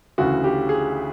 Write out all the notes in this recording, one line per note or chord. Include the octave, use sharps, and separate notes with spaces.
D2 C#3 E3 F#4
G4
G#4